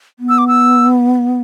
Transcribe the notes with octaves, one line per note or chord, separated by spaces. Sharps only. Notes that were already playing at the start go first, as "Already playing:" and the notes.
B3
E6
D6
E6